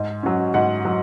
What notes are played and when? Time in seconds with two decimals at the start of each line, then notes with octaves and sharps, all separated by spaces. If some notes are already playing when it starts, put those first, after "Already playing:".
Already playing: G#2
0.23 F#3 C#4
0.54 G#2 F#5
0.85 F#3